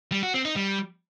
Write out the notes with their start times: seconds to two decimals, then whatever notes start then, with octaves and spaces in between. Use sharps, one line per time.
0.12 G3
0.23 F#4
0.34 C4
0.45 D#4
0.56 G3